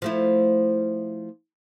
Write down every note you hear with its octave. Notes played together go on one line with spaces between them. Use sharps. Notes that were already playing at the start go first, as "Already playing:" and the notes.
F3 A3 E4